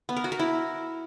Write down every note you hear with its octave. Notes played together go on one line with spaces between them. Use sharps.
B3
A#4
F#4
A#4
E4